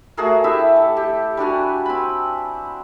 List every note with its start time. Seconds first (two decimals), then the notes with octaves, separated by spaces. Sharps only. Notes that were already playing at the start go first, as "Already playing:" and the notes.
0.17 A3 F#4 G#4 A#4
0.44 E4 G4 E5 A5
0.77 A4
0.97 G4
1.37 G3 D4 F#4 G#5
1.86 C4 B5